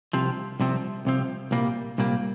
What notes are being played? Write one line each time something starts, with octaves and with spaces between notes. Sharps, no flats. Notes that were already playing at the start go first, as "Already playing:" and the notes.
C2 C3 F3 C4
C2 C3 F3 C4
C2 C3 F3 C4
C2 A#2 G3 A#3
C2 A#2 G3 A#3